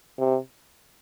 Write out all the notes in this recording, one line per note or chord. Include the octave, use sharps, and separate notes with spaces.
C3